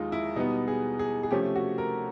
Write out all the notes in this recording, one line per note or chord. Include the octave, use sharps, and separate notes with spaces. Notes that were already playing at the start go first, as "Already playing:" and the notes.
Already playing: D#2 D#3 G#3 D#4 F4
E4
B2 G3 B3 D#4
G#4
G#4
G#4
C3 F3 A3 C#4 G4
F#4
A#4